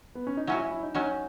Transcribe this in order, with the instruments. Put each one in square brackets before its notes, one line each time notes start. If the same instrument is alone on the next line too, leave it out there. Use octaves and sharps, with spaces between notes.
[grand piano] B3
C#4
D#4
[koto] F#3 C#4 F#4 [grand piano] E4
[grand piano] E4
E4
D#4
[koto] F#3 C#4 F#4 [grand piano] D#4